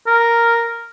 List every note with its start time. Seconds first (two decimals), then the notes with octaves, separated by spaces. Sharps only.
0.07 A#4